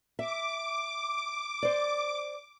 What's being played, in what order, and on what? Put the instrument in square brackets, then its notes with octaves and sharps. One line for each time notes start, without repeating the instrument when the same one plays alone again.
[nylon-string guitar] E5 [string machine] D6
[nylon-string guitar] C5 D5